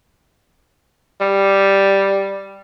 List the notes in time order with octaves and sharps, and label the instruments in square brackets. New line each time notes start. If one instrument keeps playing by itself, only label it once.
[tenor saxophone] G3